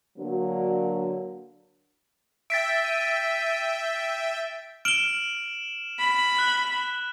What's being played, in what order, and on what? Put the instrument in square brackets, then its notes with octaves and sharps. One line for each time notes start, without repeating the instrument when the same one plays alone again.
[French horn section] D3 F#3 A#3 D4 F#4
[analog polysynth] E5 G5 [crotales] A6 B6 D7
[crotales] D#7
[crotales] F6 E7 F#7 [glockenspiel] D7 G7
[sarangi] B5
[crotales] F#6